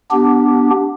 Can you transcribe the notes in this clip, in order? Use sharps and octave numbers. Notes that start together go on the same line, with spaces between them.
B3 D4 G4